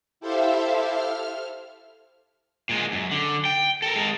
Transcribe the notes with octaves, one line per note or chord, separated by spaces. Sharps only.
E4 G4 A4 C5 E5 F5
F6
A#2 G#3
F#2
D3
G5
A4 A#4
G#3 A#4